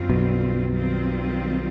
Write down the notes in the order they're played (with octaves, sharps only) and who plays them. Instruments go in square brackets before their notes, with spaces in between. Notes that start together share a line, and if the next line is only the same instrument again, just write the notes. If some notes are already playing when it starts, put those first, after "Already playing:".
Already playing: [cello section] F#2 D3 G3 C4 F4
[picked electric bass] B1 B2
[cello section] D#3 G3 C4 F4